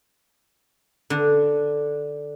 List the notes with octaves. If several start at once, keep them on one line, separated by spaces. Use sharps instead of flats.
D3